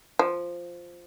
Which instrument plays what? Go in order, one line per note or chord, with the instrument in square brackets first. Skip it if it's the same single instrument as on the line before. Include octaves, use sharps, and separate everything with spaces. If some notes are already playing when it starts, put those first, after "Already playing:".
[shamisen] F3